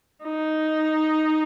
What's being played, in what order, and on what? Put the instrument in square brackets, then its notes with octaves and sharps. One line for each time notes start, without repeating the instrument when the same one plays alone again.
[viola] D#4